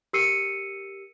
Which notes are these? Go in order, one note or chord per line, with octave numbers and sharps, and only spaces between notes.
G4 A#4 E6 C7 C#7 D#7